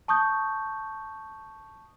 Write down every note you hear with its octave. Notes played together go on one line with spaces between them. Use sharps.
A5 C#6 D#6 G6